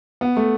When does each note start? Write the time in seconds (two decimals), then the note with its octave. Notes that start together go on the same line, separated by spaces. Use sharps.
0.21 B3
0.37 A3